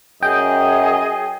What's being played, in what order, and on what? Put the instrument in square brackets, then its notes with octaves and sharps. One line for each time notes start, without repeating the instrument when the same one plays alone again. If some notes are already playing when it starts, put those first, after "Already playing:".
[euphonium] F#2 [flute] G#4 [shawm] D#5 [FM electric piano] G5